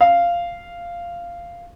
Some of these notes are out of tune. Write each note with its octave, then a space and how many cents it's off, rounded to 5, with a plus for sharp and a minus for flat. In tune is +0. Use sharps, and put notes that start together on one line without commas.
F5 -10